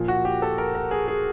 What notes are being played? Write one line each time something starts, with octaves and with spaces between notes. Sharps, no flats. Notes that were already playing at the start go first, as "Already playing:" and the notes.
Already playing: A#2 F3
F#4
G4
A4
A#4
A#4
G#4
G#4